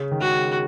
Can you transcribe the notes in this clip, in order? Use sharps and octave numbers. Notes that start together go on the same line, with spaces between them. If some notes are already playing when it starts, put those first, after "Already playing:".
Already playing: C#3
D#3
G#3 F#4